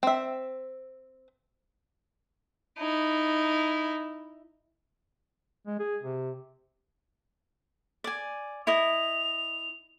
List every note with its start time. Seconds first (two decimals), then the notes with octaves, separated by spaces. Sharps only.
0.03 C4 E5
2.78 D#4 E4
5.66 G#3
5.79 G#4
6.02 C3
8.04 D5 G#5
8.67 E4 D#5 F7